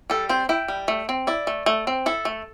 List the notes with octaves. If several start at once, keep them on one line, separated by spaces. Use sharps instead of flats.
G3 A4
C4 C5
E4 G5
G3
A3
C4
E4 D5
A3
A3
C4
E4 A4
A3